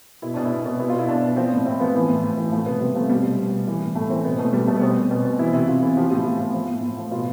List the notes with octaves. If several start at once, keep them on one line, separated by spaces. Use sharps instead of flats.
B2 E4
B2 D4
E4
B2
B2
B2 E4
F4
B2 E4
B2 D4
B2
F3 C4
A2
A2 C4
F3 B3
E3
A2
A2
E3
F3 A3
C3 B3
C3 G3
F3 A3
B2 G3
B2
B2
B2
E3
A2
A2 A3
E3 C4
B2 B3
B2 A3
B2 G3
B2 A3
B3
B2 C4
B2
B2
B2
E3 E4
C3 E4
C3 F4
E3 E4
F3 G4
A2 F4
A2
F3
F3
A2
A2
F3
B2 F4